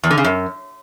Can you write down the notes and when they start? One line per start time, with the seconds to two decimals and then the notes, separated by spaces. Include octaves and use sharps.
0.03 E2
0.10 D3
0.17 C#3
0.24 F#2